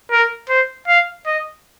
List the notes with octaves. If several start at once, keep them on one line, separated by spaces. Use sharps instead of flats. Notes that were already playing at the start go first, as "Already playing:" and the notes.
A#4
C5
F5
D#5